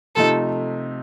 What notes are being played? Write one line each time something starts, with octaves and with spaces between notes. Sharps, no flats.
C3 F3 A3 D#4 A4